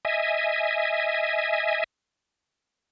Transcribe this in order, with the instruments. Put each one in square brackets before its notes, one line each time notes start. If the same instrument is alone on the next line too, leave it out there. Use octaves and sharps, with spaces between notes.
[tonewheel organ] D#5 E5 G#5